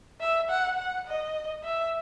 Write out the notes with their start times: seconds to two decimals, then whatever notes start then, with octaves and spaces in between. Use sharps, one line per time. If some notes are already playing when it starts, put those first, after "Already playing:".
0.20 E5
0.49 F#5
0.78 F#5
1.07 D#5
1.64 E5